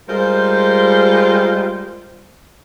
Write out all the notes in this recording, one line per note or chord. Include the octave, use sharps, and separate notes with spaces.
G3 G#3 F4 A#4 C5